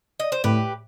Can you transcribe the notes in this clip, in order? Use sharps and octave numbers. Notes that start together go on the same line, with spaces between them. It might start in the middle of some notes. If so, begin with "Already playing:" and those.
D#5
C5
A2 G4 B4